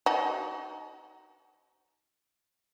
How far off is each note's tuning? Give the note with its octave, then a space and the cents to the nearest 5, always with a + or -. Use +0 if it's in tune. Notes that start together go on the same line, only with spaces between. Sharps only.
D#4 +0 F#4 +40 A5 -35